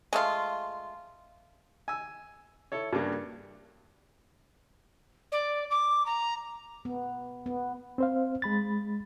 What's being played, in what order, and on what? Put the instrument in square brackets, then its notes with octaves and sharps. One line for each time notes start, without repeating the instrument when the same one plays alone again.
[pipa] G#3 A3 F4
[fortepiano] G#5 E6
E4 A4 C#5
G2 C#3 A#3 D4
[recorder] D5
D6
A#5
[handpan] B3
B3
[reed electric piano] C4 C5 F5
G#3 B5 A6